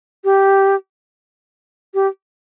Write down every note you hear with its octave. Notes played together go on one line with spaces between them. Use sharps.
G4
G4